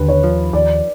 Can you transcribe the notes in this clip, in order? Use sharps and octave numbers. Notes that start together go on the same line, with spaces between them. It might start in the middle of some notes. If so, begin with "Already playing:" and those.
Already playing: D#2 D3 B4
C#5
F3
D#2 D5